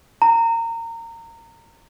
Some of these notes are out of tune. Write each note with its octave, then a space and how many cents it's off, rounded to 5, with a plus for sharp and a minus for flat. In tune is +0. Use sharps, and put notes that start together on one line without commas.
A#5 -25